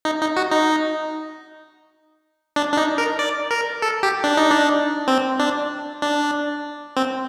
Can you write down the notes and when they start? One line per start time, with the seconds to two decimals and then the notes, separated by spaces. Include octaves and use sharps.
0.05 D#4
0.21 D#4
0.37 F#4
0.51 D#4
2.56 D4
2.72 D4
2.77 D#4
2.98 A#4
3.19 D5
3.51 A#4
3.82 A4
4.03 G4
4.24 D4
4.37 D#4
4.51 D4
5.08 C4
5.39 D4
6.02 D4
6.97 C4